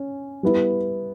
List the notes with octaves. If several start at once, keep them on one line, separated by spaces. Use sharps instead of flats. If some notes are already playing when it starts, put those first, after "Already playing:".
Already playing: C#4
G3 B3 E4